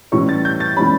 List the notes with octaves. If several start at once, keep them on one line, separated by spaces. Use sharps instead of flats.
A2 E3 G3 C#4 C#6
A6
G6
A6
A2 E3 G3 C#4 B5